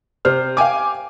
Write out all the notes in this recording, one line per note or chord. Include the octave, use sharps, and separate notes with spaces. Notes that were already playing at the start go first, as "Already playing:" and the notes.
C3 C5 F6
F5 G5 G#5 D6